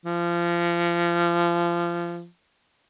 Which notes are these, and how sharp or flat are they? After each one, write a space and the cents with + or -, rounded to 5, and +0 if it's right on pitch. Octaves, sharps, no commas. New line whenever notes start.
F3 -25